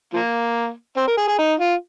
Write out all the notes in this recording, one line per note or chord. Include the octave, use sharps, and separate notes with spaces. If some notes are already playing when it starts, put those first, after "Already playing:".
F3 A#3
C4
A#4
G#4
G#4
D#4
F4